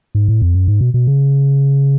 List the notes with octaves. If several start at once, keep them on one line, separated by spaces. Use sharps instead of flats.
G#2
A2
F2
F#2
G#2
B2
B2
C#3